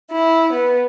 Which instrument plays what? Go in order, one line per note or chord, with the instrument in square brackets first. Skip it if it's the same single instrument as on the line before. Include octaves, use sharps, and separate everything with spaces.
[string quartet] E4
B3